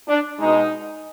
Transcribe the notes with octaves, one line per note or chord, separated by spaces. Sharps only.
D4
B2 G#3 D#4